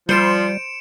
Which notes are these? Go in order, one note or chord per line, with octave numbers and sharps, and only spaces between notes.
F3 G3 C5 C#7 D7 E7